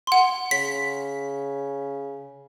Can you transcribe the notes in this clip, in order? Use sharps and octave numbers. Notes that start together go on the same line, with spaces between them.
F#5 C6
C#3 B6